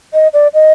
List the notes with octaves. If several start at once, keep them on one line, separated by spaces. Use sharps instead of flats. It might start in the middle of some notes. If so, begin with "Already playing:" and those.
D#5
D5
D#5